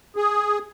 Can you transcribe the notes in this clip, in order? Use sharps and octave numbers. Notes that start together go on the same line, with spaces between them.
G#4